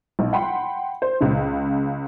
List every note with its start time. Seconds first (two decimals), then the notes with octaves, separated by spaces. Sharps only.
0.19 B1
0.33 F#5 G5 B5 C6
1.02 C5
1.21 C#2 C#3